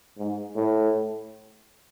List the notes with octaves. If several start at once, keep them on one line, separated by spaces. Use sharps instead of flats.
G#2
A2